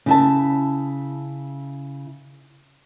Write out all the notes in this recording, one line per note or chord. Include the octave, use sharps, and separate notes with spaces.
C#3 E4 A5